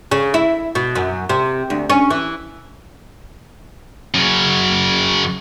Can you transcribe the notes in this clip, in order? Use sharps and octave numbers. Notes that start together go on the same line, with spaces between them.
C#3
E4
B2
F#2
C3
D2
C#4
E3
F#2 C#3